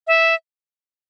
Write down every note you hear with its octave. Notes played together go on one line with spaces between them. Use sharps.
E5